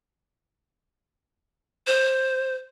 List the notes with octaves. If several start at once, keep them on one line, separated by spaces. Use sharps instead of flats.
C5